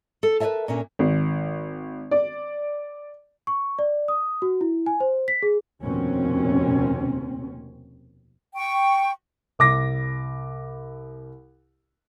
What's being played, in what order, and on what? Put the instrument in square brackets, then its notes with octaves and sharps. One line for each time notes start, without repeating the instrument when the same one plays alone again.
[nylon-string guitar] A4
A#4 B4 C#5 D5 E5 A5
A#2 A#3 C#4 D4
[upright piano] G#1
D5
[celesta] C#6
D5
D#6
F#4
E4
G#5
C5
B6
G#4
[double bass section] F1 D#2 B2 A#3 C4 C#4
[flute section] G5 C#6
[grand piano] C2 D6 A#6